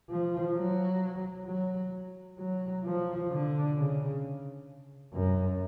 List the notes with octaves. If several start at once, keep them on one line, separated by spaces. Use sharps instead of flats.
F3
F#3
F#3
F#3
F3
D3
C#3
F#2